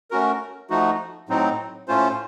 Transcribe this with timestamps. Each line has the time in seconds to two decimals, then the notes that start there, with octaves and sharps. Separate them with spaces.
0.11 A3 C#4 F#4 A#4
0.70 F3 A3 D#4 F#4
1.29 A2 F#3 C4 D#4
1.88 A2 A3 C#4 F4 C5